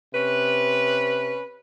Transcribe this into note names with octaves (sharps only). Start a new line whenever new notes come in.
C3 C#4 B4